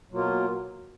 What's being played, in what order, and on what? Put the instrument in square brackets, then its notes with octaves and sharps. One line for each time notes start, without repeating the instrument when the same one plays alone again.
[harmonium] B2 F#3 A#3 F4